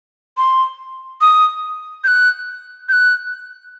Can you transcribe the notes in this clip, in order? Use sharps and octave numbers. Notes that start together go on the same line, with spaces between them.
C6
D#6
G6
F#6
G6
F#6